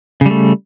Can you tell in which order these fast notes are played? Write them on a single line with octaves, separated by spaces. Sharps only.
C#3 G3 A3